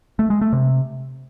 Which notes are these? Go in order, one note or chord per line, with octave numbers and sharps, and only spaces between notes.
A3
G#3
A3
C3